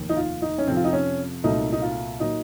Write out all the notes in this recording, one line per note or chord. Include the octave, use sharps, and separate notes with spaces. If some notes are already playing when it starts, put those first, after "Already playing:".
Already playing: F1 D#2 D#3
D#4
F4
D#4
C#4
F2 C3 F3 C4
F4
D#4
C#4
C2 A#2 F#3 A3 D#4
D#4
F4
A#2 F#3 A#3 D#4